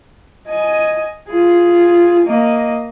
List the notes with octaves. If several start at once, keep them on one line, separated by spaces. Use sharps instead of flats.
D#5 G#5
F4 G#4
A#3 D#5